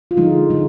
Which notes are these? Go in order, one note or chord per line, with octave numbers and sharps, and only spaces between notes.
F4
D3 F3 G#3 D#4
D3 F3 G#3